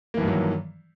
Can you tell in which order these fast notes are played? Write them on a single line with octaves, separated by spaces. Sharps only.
A#3 E3 G2 D#3 F#3